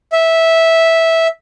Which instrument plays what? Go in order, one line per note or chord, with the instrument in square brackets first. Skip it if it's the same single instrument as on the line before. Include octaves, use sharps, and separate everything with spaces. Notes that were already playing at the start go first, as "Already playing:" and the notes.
[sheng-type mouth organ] E5